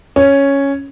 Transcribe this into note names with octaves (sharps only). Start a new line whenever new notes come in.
C#4